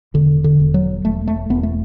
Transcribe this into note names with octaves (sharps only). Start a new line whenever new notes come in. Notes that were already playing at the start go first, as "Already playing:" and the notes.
E1 D3
D3
E1
F#3
E1 A3
A3
E1 B3
A3